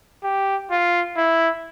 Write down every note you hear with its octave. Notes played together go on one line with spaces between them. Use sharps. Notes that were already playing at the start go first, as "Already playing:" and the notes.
G4
F4
E4